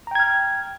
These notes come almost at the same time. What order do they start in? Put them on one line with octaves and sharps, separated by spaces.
A#5 G5 G#6 F6